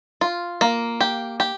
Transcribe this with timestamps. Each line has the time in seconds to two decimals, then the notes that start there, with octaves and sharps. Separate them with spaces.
0.21 F4
0.61 A#3
1.01 G4
1.40 G4